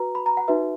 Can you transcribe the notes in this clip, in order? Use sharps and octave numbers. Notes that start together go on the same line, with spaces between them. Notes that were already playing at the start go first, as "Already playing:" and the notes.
Already playing: F#4 B4 A#5
B5
A#5
F#5
D#4 F#4 B4 E5